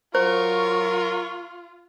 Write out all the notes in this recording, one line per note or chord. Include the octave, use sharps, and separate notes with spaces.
F#3 F4 A#4 C5 C#6